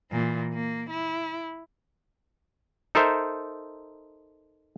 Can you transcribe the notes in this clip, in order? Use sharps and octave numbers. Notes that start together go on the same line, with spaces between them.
A#2 E3
A#3
E4
D#4 A4 A#4 C5 E5